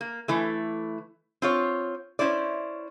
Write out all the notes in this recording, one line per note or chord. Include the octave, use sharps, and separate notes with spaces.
A#3
E3 A3
C4 F4 C#5
C#4 E4 C5 D5